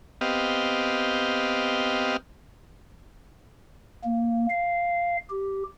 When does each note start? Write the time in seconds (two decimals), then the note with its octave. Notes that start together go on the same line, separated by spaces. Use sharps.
0.21 B3 C4 G4 D#5 F5
4.04 A#3
4.50 F5
5.30 G4